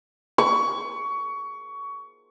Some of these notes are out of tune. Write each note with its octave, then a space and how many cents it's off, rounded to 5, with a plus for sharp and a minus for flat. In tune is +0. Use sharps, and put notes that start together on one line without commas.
C#6 +20